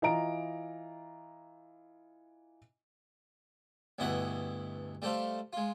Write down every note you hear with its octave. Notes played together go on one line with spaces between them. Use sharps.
E3 F4 D#5 A#5 D7
D2 G2 B2 E4 D#5 F#5
G3 A3 G4 A4 C5 F5
G#3 F4